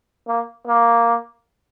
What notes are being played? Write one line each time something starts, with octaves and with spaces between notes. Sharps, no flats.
A#3
A#3